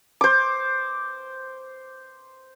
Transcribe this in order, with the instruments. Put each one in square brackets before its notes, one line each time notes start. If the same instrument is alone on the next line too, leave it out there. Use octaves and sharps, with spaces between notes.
[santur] C5 D6